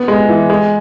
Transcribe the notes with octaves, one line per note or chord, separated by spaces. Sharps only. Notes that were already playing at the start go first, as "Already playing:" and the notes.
Already playing: B3
G#3
E3
G#3